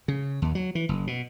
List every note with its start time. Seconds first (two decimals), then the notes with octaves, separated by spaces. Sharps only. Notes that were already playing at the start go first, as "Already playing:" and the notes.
0.08 C#3
0.42 D#2
0.55 F#3
0.75 E3
0.89 F#1
1.07 B2